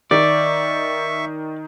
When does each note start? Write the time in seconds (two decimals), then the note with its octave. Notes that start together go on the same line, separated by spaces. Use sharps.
0.11 D#3 D5 E5 C#6